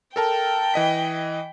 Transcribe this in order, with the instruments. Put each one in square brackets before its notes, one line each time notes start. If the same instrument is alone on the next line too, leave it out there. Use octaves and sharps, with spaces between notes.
[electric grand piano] A4 A#4 A5 [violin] G5
[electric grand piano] E3 D#5 B6